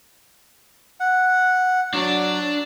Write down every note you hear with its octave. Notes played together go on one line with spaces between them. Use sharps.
F#5
F#3 D4 D5